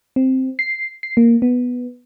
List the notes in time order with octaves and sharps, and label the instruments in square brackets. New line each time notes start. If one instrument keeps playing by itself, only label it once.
[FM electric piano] C4
C7
C7
A#3
B3